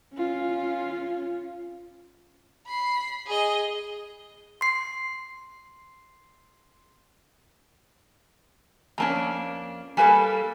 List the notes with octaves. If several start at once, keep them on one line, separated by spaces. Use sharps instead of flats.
C#4 F4
B5 C7
G#4 D#5
C6 C7
F2 A#3 C#4 D4 A5 A#5
G3 A#3 A4 B4 G#5 B5